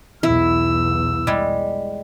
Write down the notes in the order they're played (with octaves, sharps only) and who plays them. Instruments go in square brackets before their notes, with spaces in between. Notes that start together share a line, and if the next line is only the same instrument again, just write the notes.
[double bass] B1 E2 [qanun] E4 [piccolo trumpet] E6
[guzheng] G3 G#3